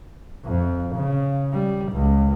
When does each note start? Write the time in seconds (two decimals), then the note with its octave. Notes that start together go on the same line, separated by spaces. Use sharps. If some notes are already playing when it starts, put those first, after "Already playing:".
0.46 F2
0.96 C#3
1.53 G3
1.93 C#2